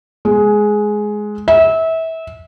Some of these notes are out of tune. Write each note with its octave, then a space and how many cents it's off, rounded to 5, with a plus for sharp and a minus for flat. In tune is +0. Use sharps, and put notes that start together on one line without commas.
G#3 +10
E5 -25